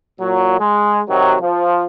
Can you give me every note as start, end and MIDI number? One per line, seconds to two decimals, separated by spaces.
0.20 0.54 46
0.20 0.54 54
0.59 0.98 56
1.09 1.34 48
1.09 1.34 51
1.09 1.34 54
1.40 1.83 53